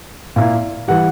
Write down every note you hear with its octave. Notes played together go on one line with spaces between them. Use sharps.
A#2 A#3 E4
E3 G3 F#5